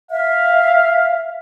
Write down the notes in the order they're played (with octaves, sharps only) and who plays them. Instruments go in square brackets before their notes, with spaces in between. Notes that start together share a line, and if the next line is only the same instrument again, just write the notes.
[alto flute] E5 [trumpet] F5